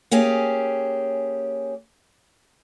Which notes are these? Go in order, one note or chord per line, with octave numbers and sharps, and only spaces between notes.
A#3 C#4 G4 G#4